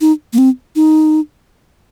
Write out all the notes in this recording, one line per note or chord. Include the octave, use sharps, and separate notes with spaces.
D#4
A#3
C4
D#4